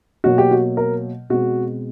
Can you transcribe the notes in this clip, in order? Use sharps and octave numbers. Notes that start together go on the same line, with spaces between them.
B2 F#3 A#3 F#4
G4
F#4
A#4
B2 G#3 C4 F#4